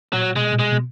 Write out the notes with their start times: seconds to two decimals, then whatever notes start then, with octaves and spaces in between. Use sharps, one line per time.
0.13 A#2 F#3
0.36 B2 G#3
0.52 A#2
0.59 B2 G#3
0.72 B2